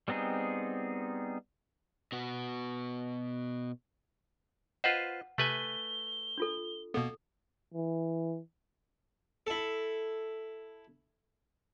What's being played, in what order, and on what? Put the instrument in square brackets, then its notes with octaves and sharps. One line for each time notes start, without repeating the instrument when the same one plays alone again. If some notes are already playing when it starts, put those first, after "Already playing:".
[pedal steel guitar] G3 B3 C4 D#4 G#4
[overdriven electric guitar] B2 F#4
[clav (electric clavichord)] F4 B4 C5 [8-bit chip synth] D#5 [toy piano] F#5
[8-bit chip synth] C3 [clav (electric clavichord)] A3 B4 G#5 [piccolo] G7
[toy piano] D4 F4 A4
[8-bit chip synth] B2 A#3 B3 [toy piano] A4
[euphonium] E3
[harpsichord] E4 A4